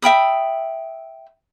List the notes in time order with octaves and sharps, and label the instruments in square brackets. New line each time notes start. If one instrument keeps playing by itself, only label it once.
[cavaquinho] E5 G5 B5 D#6